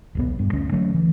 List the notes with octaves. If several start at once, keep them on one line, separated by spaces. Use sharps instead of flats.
D#1 B1 B3
G2
D2 C#4
D3 F#3 A3 C#4
E3